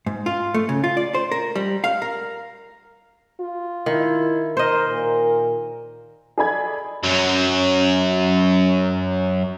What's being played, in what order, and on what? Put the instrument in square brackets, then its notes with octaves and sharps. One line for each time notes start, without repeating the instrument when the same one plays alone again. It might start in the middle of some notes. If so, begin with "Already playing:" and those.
[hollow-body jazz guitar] G#2
F4
A3
C#3
F4
D5
C5
A#4
G3
F5
A#4
[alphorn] F4
[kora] D#3 [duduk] E4
[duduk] A#4 [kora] C5 D#5
[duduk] A#2 [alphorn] A#4
[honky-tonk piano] G#4 A4 D5 D#5 B5 G#6
[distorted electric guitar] F#2 F#3